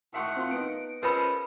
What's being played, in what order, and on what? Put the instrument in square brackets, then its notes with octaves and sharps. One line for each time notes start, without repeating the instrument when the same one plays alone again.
[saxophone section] A2 D#3 F#5 [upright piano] E5 C6 C#6
[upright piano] C4 F4 C6
[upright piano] B3 D#4 [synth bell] D7
[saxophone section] F3 G#3 C#4 [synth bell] A#4 B4 B5